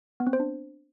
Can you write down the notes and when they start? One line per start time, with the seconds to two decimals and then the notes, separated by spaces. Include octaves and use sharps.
0.20 B3
0.27 C4
0.33 C5
0.40 D4